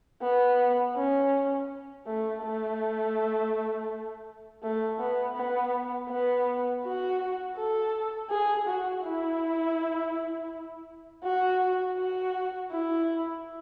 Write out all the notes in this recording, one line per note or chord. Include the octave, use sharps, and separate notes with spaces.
B3
C#4
A3
A3
A3
B3
B3
B3
F#4
A4
G#4
F#4
E4
F#4
F#4
E4